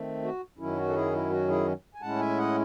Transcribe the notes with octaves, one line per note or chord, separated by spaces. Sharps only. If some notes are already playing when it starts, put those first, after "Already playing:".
Already playing: D#3 A3 C4
F#4
F#2 D#3 F#3 C#4 E4
F#4
A4
E4 G#4
E4
F#4
E4 G#4
G#5
A2 G#3 C#4 E4 F#5 A5
E5 G#5
D#5 F#5